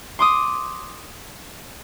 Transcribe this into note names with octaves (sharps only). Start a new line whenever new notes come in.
C6 D6 D#6